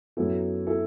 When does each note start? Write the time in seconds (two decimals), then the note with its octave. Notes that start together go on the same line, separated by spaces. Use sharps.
0.17 F#2 F#3 B3 E4 A4
0.67 E4 A4